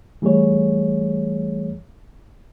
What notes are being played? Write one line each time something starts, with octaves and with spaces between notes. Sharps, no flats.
E3 G3 A3 G#4 C#5